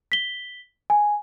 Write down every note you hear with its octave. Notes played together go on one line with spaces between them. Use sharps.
B6 G7
G#5